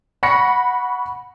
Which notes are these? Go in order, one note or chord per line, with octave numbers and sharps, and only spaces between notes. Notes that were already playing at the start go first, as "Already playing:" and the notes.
F#5 B5 C#6 A#6 C#7